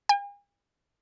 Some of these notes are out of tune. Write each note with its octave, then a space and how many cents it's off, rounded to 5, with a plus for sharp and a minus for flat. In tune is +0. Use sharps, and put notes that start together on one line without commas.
G#5 -45